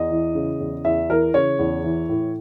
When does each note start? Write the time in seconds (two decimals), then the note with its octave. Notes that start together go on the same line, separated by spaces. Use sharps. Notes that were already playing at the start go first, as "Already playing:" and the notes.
Already playing: E2 D#5
0.11 E3
0.35 C#3
0.60 E2
0.84 E2 E5
1.10 E3 A#4
1.34 C#3 C#5
1.59 E2
1.84 E3
2.09 A2